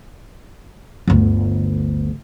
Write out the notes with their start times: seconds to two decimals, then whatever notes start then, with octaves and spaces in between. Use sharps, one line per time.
1.07 G1 D2